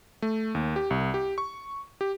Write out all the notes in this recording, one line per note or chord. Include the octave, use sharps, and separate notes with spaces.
A3
D#2
G4
C2
G4
C#6
G4